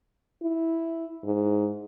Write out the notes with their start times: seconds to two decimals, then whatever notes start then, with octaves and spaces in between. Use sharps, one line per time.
0.43 E4
1.24 G#2